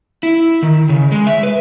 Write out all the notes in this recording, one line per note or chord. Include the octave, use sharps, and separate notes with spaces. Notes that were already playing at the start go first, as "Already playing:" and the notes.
E4
D#3
C#3
G#3
E5
B4